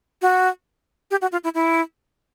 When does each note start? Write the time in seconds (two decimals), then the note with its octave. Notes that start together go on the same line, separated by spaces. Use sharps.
0.22 F#4
1.11 G4
1.22 F#4
1.32 F4
1.44 E4
1.54 E4